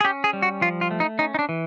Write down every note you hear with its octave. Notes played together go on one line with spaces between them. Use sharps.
G#4
C#4 G4
G#4
G3
F#4
F3 F4
F4
A3
D#4
C#4 D#4
D#4
D4
E3